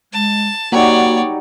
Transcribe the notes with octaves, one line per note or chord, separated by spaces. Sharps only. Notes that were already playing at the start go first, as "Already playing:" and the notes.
G#3 A5
F#3 G3 A#3 D#4 F#4 C#5 D5 F#5